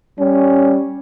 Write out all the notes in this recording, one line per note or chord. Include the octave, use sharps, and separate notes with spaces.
G3 C#4